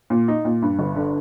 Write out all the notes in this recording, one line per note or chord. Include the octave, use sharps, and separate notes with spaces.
A#2
D#4
A#2
G2
G1
D3